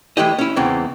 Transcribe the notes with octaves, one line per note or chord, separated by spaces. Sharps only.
E3 G#3 A3 E4 G4 D#5
C#4 E4
E2 C#3 E3 G#3 C4